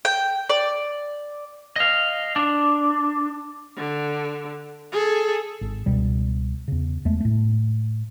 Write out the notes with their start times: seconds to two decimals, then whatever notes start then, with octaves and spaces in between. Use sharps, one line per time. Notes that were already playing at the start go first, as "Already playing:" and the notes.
0.05 G5
0.50 D5
1.76 D#5 F5
2.36 D4
3.76 D3
4.92 G#4 A4
5.61 G#1
5.86 C#2 B2 G3
6.68 E2 C#3
7.05 E2 G#3 A3
7.20 A2 A3